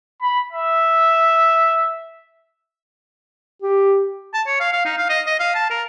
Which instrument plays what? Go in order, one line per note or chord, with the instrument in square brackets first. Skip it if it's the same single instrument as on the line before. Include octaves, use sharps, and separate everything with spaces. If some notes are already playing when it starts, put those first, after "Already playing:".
[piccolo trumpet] B5
E5
[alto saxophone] G4
[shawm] A5
C#5
F5
F5
D#4
F5
D#5
D#5
F5
A5
A#4